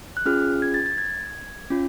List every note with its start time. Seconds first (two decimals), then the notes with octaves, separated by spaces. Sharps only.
0.17 F#6
0.26 C#4 F4 G#4 F6
0.62 G#6
0.74 A6
0.86 A6
0.98 G#6
1.70 C#4 F4